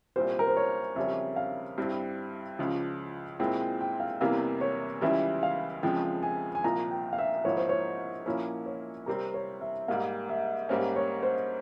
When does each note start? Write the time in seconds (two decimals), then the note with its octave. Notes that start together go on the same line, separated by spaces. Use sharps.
0.16 C2 A#2 G3 C5
0.39 A#4
0.47 C5
0.56 C#5
0.96 F2 C#3 G3 C#4 E5
1.36 F5
1.78 G2 G3 C4 E4
2.59 C#2 C#3 F3
3.40 A#2 G#3 C4 E4 G5
3.60 G5
3.81 G5
4.00 F5
4.21 E2 C3 E3 G3 A#3 F5
4.61 C#5
5.01 C#2 C#3 E3 G3 E5
5.43 F5
5.83 F2 C#3 F3 G#3 G5
6.23 G#5
6.55 G#5
6.64 C2 A#2 F3 A#5
6.91 G5
7.13 F5
7.18 E5
7.45 G#2 F3 A#3 E4 C#5
7.57 C5
7.69 C#5
8.26 A#2 F3 A#3 C#4 E4 C#5
8.66 C#5
9.06 C3 G3 C4 A#4
9.34 C#5
9.61 E5
9.88 G#2 G3 A#3 F5
10.29 E5
10.69 G#2 G3 A#3 C#4 C5
10.96 C#5
11.23 C5